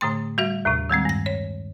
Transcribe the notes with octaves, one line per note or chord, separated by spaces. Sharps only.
A2 D3 A3 C6
G3 F#4 E5
D#2 A2 C3
D#3 G3 G#3 C4
G2 A#6
C#5